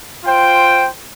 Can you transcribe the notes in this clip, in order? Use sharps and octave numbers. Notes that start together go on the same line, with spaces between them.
F4 C5 G5